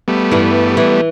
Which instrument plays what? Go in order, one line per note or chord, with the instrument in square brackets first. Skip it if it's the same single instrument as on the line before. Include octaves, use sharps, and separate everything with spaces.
[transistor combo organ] G3 A3 B3
[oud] G2 E3
E3